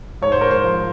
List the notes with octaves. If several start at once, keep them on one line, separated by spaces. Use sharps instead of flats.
G#2 C#5
C5
A#4
C5
F3